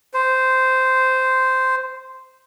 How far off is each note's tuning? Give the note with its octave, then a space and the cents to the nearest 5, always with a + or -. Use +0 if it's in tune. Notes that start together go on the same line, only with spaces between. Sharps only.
C5 -10